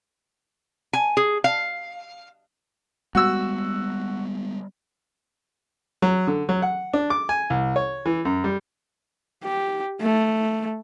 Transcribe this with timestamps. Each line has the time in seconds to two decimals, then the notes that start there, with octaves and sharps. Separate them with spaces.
0.93 G#5
1.17 G#4
1.44 F5
3.15 G3 G#3 B3 F#4 E6
6.02 F#3
6.27 D3
6.49 F#3
6.62 F#5
6.94 D4
7.10 D6
7.29 G#5
7.50 C2
7.76 C#5
8.06 E3
8.25 F#2
8.44 G3
9.44 G4
10.01 A3